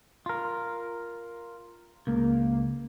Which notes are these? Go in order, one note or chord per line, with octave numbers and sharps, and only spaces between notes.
F4 A#4
C#2 A#3